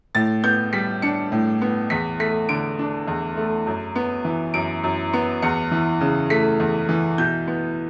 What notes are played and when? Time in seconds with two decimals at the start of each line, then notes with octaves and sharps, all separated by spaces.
0.15 A2 A6
0.44 B3 G6
0.73 G3 B6
1.02 D4 C#7
1.32 A2
1.61 B3
1.90 E2 B6
2.20 A3 B6
2.49 D3 D7
2.79 D4
3.07 E2
3.37 A3
3.67 F#2
3.96 B3
4.25 E3
4.54 F#2 D7
4.84 F#2
5.13 B3
5.42 E2 C#7
5.71 E3
6.01 C#3
6.30 A3 B6
6.60 E2
6.89 E3
7.18 B2 G6
7.47 B3